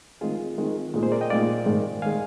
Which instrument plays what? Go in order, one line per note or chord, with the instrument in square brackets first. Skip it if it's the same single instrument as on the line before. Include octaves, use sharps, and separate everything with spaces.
[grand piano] D#3 G#3 C4 D#4 [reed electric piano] F4 G#4
[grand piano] D#3 G#3 C4 D#4
A#2 G#3 D#4
[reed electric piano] G#4 C5
A#4 D5
D#5 G5
[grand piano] A#2 G#3 D#4 [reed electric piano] D5 F5
[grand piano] G#2 D#3 G#3
[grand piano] D#3 G#3 [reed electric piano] F5 G#5